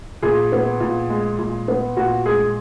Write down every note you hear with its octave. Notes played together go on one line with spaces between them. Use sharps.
A#2 G#4
B3
A#2
G#3
A#2
B3
A#2 F#4
G#3 G#4